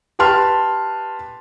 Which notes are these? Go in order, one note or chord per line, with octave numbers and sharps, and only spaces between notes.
G4 B4 A5 C6 F6